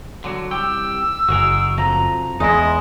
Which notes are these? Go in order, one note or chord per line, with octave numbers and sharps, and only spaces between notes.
D3 F#3 F#4
C2 G4 G5 E6
F#1 F#4 G#4 A#4
F2 F3 F#3 A#5
E2 G#3 D#4 E4 D#5